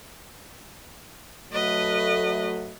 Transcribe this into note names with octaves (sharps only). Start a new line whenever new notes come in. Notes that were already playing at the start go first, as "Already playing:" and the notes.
F#3 A3 B4 D#5